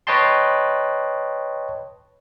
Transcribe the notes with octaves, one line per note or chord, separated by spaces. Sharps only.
B4 C#5 D#5 G5 A5 C6